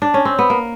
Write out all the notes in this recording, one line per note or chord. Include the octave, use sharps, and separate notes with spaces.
D4
C#4
C4
B3
A#3